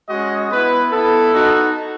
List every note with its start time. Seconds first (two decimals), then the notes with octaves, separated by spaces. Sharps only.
0.08 G#3 C#4 F#4 D#5
0.50 B3 E4 B4
0.92 B3 E4 A4
1.33 B3 D#4 F#4